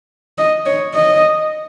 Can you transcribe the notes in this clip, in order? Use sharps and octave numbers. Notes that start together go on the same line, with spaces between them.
D#5
C#5
D#5